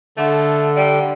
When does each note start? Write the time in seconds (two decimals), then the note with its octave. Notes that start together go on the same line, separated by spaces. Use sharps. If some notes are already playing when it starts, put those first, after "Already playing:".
0.17 D3 A3
0.76 G3